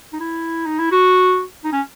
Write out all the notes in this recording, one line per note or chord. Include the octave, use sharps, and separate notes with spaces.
D#4
E4
D#4
E4
F#4
D#4
C#4